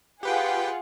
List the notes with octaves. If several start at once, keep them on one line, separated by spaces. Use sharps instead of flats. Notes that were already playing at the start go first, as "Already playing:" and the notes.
F4 G4 G#4 B4 F#5 G5